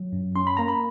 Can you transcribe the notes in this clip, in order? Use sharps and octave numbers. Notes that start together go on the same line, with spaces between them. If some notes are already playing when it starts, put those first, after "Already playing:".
Already playing: F#3
F#2
C#4 C6
B5
A#3 A#5
B5